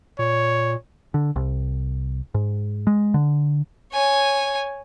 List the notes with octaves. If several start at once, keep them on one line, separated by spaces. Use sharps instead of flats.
A#2 C#5
D3
C2
G#2
G#3
D3
C#5 G#5